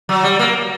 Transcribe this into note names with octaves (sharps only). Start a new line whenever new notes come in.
F#3
G3
A#3